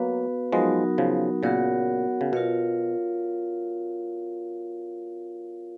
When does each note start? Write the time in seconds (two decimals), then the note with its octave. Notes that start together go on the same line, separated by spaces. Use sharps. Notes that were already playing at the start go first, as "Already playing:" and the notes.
Already playing: F#3 A#3 B3 F#4 B4 F5
0.52 F3 F#3 G#3 B3 D#4 F#4 A#4
0.98 C#3 F3
1.43 A#2 C#3 B3 F#4 A#4 C#5 F#5
2.21 C#3
2.33 B2 F4 A#4 C#5 F5